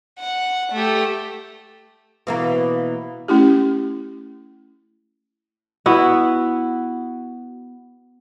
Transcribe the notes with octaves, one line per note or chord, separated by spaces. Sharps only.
F#5
A3 G4
B2 E3 A#3
A3 C#4 E4 G4
B3 E4 F#4